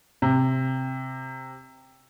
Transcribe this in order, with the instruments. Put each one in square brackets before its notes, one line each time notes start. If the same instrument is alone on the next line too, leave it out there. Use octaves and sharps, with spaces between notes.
[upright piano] C3